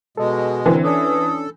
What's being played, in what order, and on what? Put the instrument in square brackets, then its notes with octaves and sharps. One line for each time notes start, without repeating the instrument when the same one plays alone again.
[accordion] B2 G#3 [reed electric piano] A4 D#5
[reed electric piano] D3 C4 D4 [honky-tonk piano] E3 [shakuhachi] A#4
[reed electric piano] C#4 D4 [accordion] A4 [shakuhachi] D#6